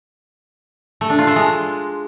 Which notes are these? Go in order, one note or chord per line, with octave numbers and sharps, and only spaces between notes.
A3
D4
F4
A3
G#3